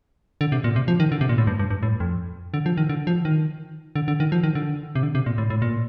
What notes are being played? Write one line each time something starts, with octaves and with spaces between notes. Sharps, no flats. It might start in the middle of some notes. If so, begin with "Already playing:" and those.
D3
C3
A#2
C3
F3
D#3
D3
C3
A#2
A2
G2
G2
G2
A2
F2
D3
F3
D#3
D3
F3
D#3
D3
D3
D#3
F3
D#3
D3
C3
D3
C3
A#2
A2
A2
A#2